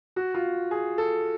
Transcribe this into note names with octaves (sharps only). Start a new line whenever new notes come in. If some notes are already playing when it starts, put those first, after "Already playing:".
F#4
F4
G#4
A4